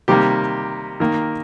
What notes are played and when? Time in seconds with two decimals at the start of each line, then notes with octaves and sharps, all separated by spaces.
0.08 C3 D#3 G3 A#3 G4
1.00 D#3 A#3